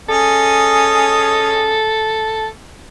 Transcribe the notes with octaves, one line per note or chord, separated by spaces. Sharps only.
C#4 G#4 A4 D#5